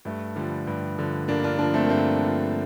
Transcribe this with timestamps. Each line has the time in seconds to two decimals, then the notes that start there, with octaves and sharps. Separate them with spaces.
0.05 G2 A3
0.36 D3 F3 G3
0.67 G2
0.98 D3 F3
1.28 G2 A#3 D4
1.43 D4 F4
1.58 D3 F3 A#3 D4
1.74 A3 C4
1.84 A#3
1.89 G2 A3 C4
2.21 D3 F3